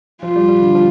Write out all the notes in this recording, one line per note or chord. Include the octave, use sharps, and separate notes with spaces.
F3 F4
G3
G3
D3
F3